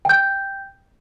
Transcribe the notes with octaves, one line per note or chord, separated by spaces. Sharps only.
G5 G6